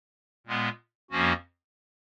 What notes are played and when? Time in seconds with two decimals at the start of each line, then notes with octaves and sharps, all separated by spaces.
0.47 A#2 G#3 B3
1.11 F2 F3 A#3 C#4 F#4